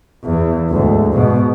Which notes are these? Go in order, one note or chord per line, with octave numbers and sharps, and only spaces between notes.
E2
D2 G#2
G#2 B2